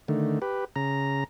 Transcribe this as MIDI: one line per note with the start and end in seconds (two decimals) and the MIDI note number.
0.08 0.39 50
0.08 0.39 51
0.08 0.39 57
0.42 0.65 67
0.42 0.65 71
0.76 1.24 49
0.76 1.24 82